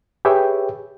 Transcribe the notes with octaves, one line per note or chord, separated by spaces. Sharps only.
G4 G#4 B4 C#5 E5 G5